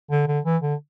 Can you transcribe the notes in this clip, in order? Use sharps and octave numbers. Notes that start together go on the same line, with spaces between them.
D3
D3
E3
D3